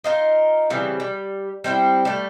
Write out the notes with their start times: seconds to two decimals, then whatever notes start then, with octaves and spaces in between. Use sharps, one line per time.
0.04 D#4 F4 A#4
0.70 C#3 E3 G3 C4
1.00 G3
1.64 G3 C4 D#4 E4
2.05 G3 A3